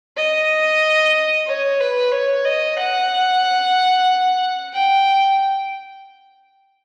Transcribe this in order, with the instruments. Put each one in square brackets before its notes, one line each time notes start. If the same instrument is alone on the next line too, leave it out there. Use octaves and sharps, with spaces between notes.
[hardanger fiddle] D#5
C#5
B4
C#5
D#5
F#5
G5